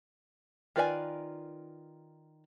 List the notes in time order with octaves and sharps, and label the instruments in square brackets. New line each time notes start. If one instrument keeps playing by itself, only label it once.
[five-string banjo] D#3 F4 B4 D5 G#5